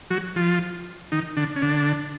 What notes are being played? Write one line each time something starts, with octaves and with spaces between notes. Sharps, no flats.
F#3 F#4
F3 F4
D#3 D#4
D3 D4
C#4
D3 D4